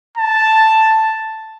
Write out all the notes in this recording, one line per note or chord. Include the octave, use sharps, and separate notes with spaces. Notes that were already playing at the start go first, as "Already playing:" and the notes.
A5